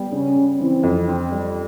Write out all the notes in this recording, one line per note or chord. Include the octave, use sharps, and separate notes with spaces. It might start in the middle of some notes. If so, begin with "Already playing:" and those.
Already playing: G3 B3
C#3 C#4
C#3
E3 C4
F2
C4
G3